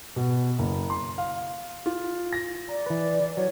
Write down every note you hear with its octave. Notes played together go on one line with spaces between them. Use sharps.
B2
F#1
C6
F5
F4
A#6
D5 A#5
E3 B4
F#3 C#5